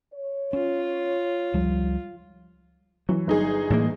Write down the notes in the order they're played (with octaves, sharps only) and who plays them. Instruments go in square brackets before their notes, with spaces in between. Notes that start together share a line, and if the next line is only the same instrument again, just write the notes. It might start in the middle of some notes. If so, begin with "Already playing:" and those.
[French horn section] C#5
[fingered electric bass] C#4 [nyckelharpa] F4
[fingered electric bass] C#2 F3 G3
[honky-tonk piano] E3 [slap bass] F#3
[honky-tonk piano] G1 D#4 G#4
[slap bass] A2 E3 A#3